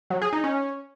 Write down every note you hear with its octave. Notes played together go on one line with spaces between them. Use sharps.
F#3
G#4
D#4
C#4